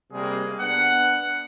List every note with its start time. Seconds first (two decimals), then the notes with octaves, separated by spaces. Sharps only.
0.11 C3 G3 G#3 A#3 G#4
0.60 B3 D4 F#5